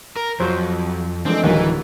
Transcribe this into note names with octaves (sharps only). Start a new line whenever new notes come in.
A#4
F2 F#3 F#4 C5
E3 F3 G#3 A3 C4 D4
D1 D#3 E3 F#3 A#3